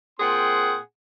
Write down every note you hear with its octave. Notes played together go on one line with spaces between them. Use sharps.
A#2 C4 G#4 F#5 G5 C6